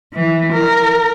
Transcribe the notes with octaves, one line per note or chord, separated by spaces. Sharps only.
E3
A#4